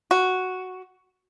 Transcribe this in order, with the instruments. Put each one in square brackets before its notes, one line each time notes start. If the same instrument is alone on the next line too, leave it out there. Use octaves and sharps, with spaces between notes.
[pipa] F#4